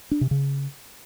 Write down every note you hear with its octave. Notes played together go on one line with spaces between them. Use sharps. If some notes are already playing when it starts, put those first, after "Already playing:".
D4
C3
C#3